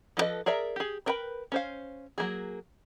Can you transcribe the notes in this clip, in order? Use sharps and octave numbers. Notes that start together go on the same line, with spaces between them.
F3 D#4 A4 B4 D#5
G#4 A#4 D5 E5 A#5
G4 G#4
D4 A#4 B4 G5 B5
C#4 C5 F5
F#3 A3 A#3 G#4